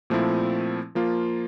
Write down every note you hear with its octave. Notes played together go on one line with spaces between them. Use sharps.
A#2 F3 A3 C4 E4
F3 A#3 F4